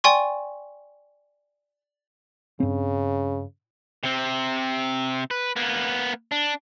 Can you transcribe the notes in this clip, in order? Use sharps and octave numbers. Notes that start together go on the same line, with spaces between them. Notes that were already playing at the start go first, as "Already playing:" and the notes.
D5 G5 G#5 C6 C#6
G2 C#3 C4
C3 C4
B4
A#3 B3
D4